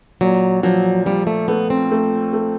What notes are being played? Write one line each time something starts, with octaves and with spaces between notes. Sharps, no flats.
A#2 F#3
F3 F#3
F3 G3
A3
A3 B3
C4
A3
A3